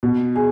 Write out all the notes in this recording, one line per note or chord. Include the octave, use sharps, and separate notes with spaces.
B2
G#4